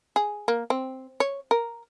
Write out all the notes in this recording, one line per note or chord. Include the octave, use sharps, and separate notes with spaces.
G#4
A#3
C4
C#5
A#4